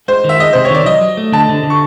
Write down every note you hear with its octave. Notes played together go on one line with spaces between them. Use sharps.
G#3 C5
D#3 E5
G#3 D#5
C3 C5
C#5
D#3 D5
F#3 D#5
F#3
A3
D3 A5
D3
D3
C#6